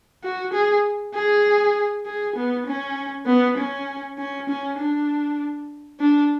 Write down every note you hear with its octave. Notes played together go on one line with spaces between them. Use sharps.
F#4
G#4
G#4
G#4
B3
C#4
B3
C#4
C#4
C#4
D4
D4